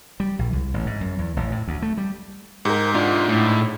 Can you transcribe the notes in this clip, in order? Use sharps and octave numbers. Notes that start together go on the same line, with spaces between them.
G3
A#1
C2
A1
G#2
F#2
E2
A1
A2
D2
A3
G3
G#2 G4 A#4
D4 F4 F#5
A2